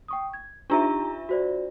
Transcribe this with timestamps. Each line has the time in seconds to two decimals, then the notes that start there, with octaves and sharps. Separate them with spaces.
0.08 G5 C#6 D#6
0.34 G#6
0.70 D4 D#4 F4 G4 E5 A#5
1.29 F#4 C5 D5